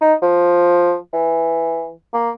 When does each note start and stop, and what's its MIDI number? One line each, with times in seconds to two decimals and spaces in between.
0.01 0.14 63
0.22 0.96 53
1.13 1.91 52
2.13 2.30 58